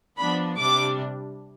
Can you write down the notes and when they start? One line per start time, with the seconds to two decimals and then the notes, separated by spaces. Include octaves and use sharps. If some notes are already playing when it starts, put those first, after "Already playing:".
0.17 F3 B3 D4 B5
0.58 C3 G3 D4 D6